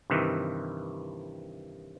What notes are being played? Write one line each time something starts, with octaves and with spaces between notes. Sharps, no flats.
G2 C3 D#3 E3